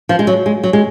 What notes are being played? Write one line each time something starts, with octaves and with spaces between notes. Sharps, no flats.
F3
G#3
F#3
G#3
F#3
G#3